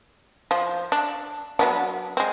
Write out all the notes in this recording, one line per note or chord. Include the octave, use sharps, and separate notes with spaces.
F3
D4
F#3 B3 D4
G#3 C4